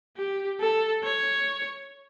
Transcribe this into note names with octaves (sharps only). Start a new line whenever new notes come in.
G4
A4
C#5